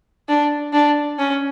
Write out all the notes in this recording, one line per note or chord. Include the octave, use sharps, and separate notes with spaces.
D4
D4
C#4